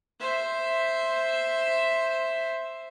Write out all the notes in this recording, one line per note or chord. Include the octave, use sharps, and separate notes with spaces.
C5 E5